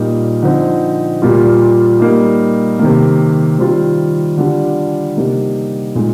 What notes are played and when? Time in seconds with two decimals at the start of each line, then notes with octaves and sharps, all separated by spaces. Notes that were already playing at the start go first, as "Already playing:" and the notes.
Already playing: A#2 G3 A#3 D#4
0.42 D3 F3 C4 D#4
1.22 A#2 G3 A#3 F4
2.00 G3 A#3 D#4
2.79 C3 D#3 A#3
3.59 D#3 G3 C4 F4
4.37 D3 G3 D4 F4
5.17 C3 G3 A#3 D#4
5.95 A#2 G#3 D#4